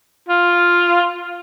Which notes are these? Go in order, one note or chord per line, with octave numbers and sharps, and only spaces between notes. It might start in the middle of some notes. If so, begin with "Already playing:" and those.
F4